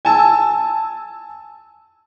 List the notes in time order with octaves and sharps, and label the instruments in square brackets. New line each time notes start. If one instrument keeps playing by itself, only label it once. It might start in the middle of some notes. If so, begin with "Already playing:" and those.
[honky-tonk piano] G#5 A5 E6